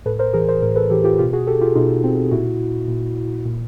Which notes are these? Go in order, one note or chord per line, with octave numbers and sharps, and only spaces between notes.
A2 A4 B4
A#4 C5
E3 G#4 A#4
A#4 C5
A2 A#4 C5
A4 B4
E3 G4 A4
F4 G4
B2 F4 G4
F#4 G#4
G4 A4
F4 G4
B2 D#4 F4
C4
A#2 E4 F#4
A#2
A#2